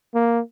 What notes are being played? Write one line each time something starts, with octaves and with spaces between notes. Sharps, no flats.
A#3